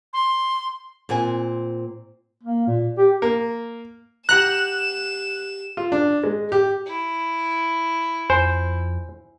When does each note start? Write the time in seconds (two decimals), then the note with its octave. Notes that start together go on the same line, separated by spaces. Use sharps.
0.13 C6
1.09 A#2 C4 F#5 G#5
2.43 A#3
2.67 A#2
2.98 G4
3.22 A#3
4.29 G4 F#5 A#5 F#6 E7
5.77 F4
5.92 D4
6.24 G#3
6.52 G4
6.86 E4
8.30 F2 C5 G#5